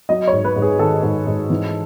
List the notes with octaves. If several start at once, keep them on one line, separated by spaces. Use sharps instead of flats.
F#3 D#5
C#5
G#2
B4
G#2
G#4
D#3 A4
G#2
G#2
E3